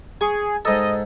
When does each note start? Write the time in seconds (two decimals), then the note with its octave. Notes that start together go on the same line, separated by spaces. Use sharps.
0.21 G#4 G#5 C#6
0.65 G#2 A4 D#5